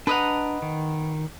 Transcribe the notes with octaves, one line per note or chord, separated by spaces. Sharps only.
D4 B4 D#5 F#5 A#5
D#3